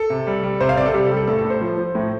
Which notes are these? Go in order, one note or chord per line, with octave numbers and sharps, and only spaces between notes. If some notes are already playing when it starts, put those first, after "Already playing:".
Already playing: A4
C3
G3
G3
C3 C5
F5
C3 D5
A4
G3 G4
A4
G3
A4
A2 A4
A4
A2
C5
F3
F3
A2